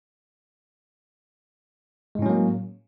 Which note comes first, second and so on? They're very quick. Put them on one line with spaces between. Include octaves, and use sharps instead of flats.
G#3 A2 C#4 F#3 A#3